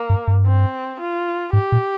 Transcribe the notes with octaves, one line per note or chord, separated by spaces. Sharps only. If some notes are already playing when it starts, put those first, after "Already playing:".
Already playing: A#3
G2
G2
C4
F4
G#2 G4
A#2